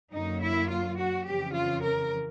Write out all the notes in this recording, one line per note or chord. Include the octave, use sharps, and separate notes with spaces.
F#2 D3 F#3 A#3 D#4
E4
F4
F#4
F2 C#3 E3 G4
F4
A#4